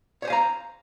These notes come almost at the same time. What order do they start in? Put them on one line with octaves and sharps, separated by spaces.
C#5 C5 G#5 F5 A#5